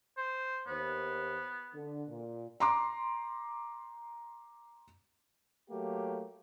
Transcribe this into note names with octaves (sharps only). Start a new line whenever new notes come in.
C5
D#2 B3 C5
D3
A#2
A#5 C6 D6
F#3 A3 A#3 G4